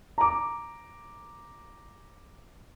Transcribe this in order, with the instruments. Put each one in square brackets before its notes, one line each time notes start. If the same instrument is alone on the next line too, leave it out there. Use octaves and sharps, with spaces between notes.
[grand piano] A#5 D6